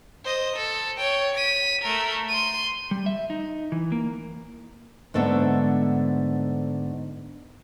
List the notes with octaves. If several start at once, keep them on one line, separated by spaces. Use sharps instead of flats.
C5 D#5
A4
C#5 G5
B6 D#7
A3 A#4
C6 D#7
G3
E5
D#4
E3
A#3
G#2 D3 A3 B3 D4